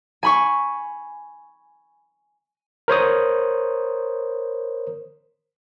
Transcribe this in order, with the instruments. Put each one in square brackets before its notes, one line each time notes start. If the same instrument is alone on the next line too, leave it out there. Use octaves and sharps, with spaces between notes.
[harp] G#5 B5 C#6
[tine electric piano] A#4 C5 C#5 D#6